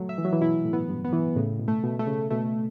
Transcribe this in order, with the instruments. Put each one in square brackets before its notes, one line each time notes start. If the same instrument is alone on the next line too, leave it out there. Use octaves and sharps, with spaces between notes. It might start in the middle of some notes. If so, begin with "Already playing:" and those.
Already playing: [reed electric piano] F#3 A3
[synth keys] E5
[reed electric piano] E3
F#3
E3
[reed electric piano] B2 [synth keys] E4
[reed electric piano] A2
[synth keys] B3
[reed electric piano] G2
[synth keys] B3
[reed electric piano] E3
[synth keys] A2 [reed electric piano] C#3
[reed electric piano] B2
[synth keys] A3
[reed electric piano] B2
[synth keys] A3
[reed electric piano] C#3
[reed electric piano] B2 [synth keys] A3